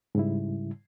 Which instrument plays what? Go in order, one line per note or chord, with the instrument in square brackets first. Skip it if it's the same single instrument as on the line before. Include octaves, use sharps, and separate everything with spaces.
[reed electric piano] G#2 C#3 G3 E4